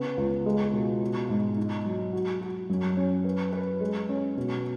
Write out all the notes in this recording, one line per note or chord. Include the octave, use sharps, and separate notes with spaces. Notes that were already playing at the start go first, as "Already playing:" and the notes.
Already playing: C#3 B3
C#2
G#3
B2
F#4
G#2
D#4
F#3
F#4
F#4
F#2
C#4
B4
B4
G#3
C#4
B2